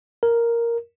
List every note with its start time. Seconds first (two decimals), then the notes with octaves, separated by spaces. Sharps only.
0.23 A#4